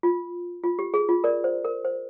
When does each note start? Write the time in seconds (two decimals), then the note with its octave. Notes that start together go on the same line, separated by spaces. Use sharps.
0.03 F4
0.64 F4
0.79 G4
0.94 G#4
1.09 F4
1.24 A#4 D5
1.44 C5
1.65 A#4
1.85 C5